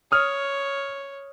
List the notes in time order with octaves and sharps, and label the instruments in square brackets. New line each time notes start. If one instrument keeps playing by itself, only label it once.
[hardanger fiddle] C#5 [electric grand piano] D#6 F6